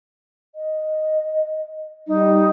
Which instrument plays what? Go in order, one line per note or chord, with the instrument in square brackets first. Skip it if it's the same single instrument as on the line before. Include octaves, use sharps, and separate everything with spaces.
[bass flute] D#5
[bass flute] G3 [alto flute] D#4